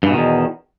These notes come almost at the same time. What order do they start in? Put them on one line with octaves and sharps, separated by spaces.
G2 E3 B2 D#3 E2